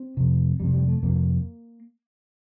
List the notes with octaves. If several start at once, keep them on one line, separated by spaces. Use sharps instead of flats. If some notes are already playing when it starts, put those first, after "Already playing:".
Already playing: C4
F2 C3
F2 C3 G3
G3
A3
F2 C3 A#3